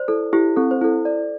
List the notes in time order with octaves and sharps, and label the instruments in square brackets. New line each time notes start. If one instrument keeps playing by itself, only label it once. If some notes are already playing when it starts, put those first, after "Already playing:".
Already playing: [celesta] C5 D5
[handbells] E4 [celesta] A4
[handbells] E4 [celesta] G4
[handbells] C4 [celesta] A4
[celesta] C5
[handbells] E4 [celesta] A4
[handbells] D5